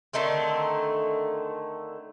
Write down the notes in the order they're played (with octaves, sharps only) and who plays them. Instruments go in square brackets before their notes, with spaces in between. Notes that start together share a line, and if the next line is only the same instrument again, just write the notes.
[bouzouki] D3 D#3 A3 C4